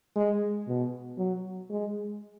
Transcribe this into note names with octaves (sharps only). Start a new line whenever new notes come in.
G#3
B2
F#3
G#3